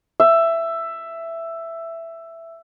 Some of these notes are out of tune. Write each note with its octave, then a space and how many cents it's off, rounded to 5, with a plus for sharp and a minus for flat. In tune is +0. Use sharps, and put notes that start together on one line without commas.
E5 +10